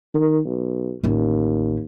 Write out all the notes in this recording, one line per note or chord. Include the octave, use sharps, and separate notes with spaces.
D#3
B1
A1 D#2 C#4